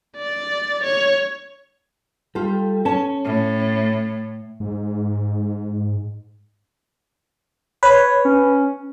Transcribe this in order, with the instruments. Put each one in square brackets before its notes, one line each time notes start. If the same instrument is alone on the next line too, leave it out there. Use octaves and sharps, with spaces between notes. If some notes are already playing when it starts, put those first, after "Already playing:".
[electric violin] D5
C#5
[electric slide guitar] G3 [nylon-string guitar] F4 A4
[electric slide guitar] C#4 [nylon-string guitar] C#5 A5
[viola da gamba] A2
[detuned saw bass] G#2
[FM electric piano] B4 [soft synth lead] C#5
[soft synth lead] C#4